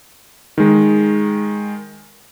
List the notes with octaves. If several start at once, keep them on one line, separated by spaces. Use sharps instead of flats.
D#3 G#3